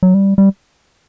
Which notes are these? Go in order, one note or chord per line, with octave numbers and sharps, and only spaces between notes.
F#3
G3
G3